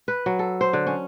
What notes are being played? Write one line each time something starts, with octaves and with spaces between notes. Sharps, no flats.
B4
F#3
A4
C5
D3
C#4